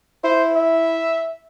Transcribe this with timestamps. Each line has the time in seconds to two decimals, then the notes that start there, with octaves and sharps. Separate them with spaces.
0.24 E4 C5
0.56 E5